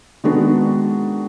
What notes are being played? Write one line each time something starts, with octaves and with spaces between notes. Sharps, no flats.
D#3 G#3 B3 D4 F#4